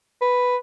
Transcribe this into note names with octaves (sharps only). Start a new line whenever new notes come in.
B4